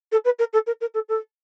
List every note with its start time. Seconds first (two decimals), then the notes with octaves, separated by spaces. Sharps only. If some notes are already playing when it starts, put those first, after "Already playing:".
0.11 A4
0.24 B4
0.38 A#4
0.53 A4
0.66 A#4
0.80 A#4
0.94 A4
1.08 A4